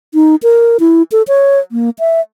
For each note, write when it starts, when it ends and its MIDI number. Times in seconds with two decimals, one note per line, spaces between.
0.14 0.36 63
0.43 0.77 70
0.80 1.03 64
1.12 1.22 69
1.28 1.59 73
1.72 1.90 58
1.99 2.21 76